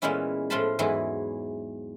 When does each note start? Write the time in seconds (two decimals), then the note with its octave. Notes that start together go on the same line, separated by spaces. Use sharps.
0.02 A#2 E3 G#3 B3 C#4 E4
0.50 A2 F3 F4 C5 A5 B5
0.79 E2 G#2 E3 F#3 E4 G#4